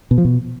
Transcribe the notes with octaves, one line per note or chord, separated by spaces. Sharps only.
B2
F3
B2